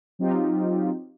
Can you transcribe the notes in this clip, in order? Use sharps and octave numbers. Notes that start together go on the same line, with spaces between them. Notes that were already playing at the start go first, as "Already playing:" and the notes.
F#3 C4 D#4 F4 G4